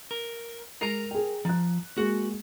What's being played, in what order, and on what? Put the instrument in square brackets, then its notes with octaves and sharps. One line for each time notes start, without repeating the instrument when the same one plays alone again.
[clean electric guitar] A#4
[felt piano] G#3 C7 D#7 [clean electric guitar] A#4 A#5
[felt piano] G#4 G5
[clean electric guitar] F3 [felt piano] A#5 F#6
[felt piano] G#3 A#3 G#4 [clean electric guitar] F#4